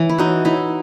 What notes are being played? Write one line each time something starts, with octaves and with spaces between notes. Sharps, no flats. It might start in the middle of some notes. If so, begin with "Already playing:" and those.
Already playing: E3
E4
D#4 F#4
D#4 E4